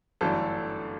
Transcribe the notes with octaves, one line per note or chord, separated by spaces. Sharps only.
G1 F#2 E3 A3 D4 A4